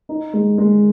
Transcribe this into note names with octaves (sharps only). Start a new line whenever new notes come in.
D#4
G#3
G#3